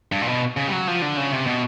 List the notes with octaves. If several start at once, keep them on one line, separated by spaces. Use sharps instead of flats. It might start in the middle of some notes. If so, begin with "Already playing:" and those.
G2
A#2
B2
C#3
G3
F#3
F3
D3
C#3
C3
B2